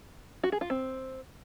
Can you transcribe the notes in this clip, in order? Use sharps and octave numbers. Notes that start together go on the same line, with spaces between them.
F#4
G#4
F4
C4